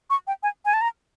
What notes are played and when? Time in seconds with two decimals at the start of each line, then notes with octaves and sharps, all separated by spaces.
0.10 C#6
0.27 G5
0.43 G#5
0.65 G#5
0.74 A5
0.81 A#5